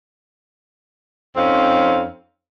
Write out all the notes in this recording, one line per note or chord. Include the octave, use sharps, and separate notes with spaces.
F2 C4 C#4 D#4 F5